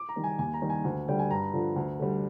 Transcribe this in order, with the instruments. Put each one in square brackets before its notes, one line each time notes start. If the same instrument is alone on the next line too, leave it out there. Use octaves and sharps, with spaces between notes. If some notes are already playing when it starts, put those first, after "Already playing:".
Already playing: [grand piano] D6
A#5
D#3 G3
G#5
D#2 G#5
A#5
D#3 G3
G#5
D2
D3 G3 G5
G#5
G2 A#5
D3 F3
D2
D3 G3